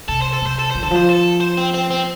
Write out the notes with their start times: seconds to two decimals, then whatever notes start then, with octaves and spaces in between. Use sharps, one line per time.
0.08 C3 A4
0.21 C5
0.33 A4
0.42 C3 C5
0.59 A4
0.71 F3 C5
0.83 D3 A4
0.91 F3
0.97 C5
1.10 A4
1.41 C5
1.57 C4
1.74 C4
1.90 C4